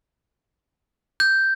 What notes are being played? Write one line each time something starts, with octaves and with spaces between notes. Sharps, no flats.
G6